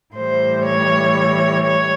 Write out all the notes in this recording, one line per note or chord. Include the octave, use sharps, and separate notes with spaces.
A2 E3 G3 C5
C#5
C#5